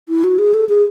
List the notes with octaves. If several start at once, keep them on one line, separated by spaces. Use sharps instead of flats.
E4
F#4
G#4
A4
G#4